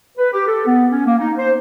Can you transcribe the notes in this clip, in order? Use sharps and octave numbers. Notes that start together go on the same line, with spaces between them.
B4
G4
A4
B3
C#4
A#3
D#4
C5